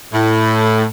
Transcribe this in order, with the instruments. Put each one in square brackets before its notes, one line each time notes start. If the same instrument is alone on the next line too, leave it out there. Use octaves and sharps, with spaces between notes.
[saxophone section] A2